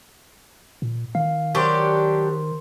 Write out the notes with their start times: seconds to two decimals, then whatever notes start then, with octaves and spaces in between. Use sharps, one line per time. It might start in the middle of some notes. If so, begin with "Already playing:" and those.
0.82 A#2
1.15 D#3 F5
1.55 F#3 D4 G4 A#4 C5 C6